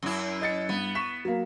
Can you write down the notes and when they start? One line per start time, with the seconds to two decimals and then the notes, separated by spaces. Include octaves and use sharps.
0.03 F#2 E4
0.41 D#5 A6 C#7
0.69 G2 B3
0.95 C#6 B6 E7
1.25 F#3 A#3